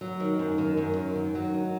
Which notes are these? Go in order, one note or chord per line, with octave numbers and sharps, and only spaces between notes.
F#3
D#3
F#2
D#3
F#2
F#3
D#3
F#3
D#4